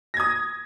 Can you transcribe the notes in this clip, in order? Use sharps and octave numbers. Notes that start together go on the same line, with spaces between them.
D#6 G#6 A#6